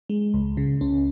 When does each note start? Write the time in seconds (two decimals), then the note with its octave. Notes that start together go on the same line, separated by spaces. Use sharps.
0.09 G#3
0.34 C#2
0.57 C#3
0.81 C#2 C#4